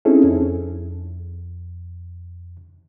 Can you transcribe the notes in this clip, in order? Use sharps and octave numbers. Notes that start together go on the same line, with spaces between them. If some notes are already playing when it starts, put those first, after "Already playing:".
C4 C#4 D#4 E4 G#4 A4
F2